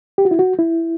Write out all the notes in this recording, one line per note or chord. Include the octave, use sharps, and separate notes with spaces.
G4
F#4
E4
F#4
E4